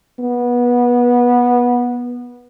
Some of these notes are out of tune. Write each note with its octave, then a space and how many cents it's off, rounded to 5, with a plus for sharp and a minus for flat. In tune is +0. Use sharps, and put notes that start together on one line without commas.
B3 -20